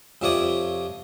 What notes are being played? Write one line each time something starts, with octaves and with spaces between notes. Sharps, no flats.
F2 C3 F3 C#5 D5 D#6